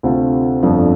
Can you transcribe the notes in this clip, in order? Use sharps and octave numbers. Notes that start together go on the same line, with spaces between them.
D2 C3 A3 C4 F4
G1 F2 F3 A3 D4